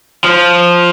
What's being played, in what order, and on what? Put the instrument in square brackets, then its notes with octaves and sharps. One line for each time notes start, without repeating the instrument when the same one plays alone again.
[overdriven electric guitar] F3